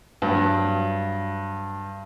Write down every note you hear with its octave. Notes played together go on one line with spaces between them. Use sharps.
G2 F#3